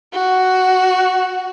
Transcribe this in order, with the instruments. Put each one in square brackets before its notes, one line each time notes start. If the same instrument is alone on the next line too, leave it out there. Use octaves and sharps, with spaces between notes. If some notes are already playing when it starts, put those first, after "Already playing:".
[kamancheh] F#4